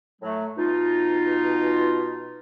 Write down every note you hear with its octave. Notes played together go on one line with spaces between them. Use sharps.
A2 F#3 A3
B2 D#4 F4